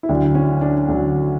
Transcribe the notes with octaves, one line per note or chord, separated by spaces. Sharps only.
E4
D2 D3 F#3 D4
C#4
D4
D2 D3 F#3